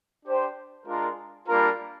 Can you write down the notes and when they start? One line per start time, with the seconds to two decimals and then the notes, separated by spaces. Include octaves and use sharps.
0.24 D4 G4 C5 G5
0.86 G#3 D4 F4 A#4
1.47 G3 A#3 D4 F4 A#4